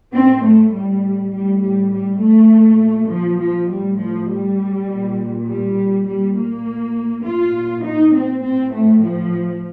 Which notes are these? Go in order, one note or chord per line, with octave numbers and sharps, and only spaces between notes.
A2 C4
A3
G3
A2 G3
G3
G3
A3
A#2
F3
F3
A2 G3
F3
G3
A#2
G3
A#2 G3
A#3
A#2 F4
D#4
C4
A2 C4
A3
F3